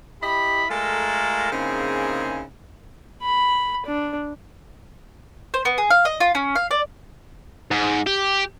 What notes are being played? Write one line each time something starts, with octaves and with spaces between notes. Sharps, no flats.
E4 G4 D#5 B5
G#3 A3 F4 A4 A#4
C#3 A#3 C4 D#4 E4 G#4
B5
D4
C5
B3
G#4
F5
D#5
F4
C#4
F5
D5
G#2
G4